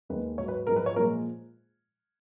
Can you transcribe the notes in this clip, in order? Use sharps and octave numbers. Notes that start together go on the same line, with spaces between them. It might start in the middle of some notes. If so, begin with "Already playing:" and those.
D#2 D#3 G#3 B4
G#2 F#3 C#5
B4
G#2 F3 G#3 A#4
B4
C#5
A#2 F3 G#3 A#4